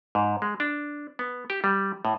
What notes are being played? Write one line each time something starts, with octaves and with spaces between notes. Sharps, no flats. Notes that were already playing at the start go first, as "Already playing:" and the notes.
G#2
G#3
D4
B3
G4
G3
A2